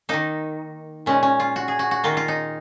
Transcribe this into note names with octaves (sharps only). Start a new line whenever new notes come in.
D#3 A#3 D#4
A#2 G#3 C#4
C#4
F4
F#4
G#4
F#4
F#4
D#3 A#3 F4
F4
D#4